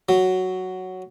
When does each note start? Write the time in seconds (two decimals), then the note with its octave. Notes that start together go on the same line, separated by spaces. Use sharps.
0.09 F#3